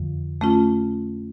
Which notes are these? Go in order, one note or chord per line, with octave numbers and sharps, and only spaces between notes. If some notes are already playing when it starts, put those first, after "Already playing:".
Already playing: F2 D3 F3
A3 C#4 F4